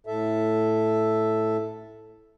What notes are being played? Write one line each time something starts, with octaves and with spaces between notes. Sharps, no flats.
A2 A4 E5